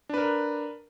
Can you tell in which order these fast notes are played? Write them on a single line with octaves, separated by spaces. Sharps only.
D4 B4 A#4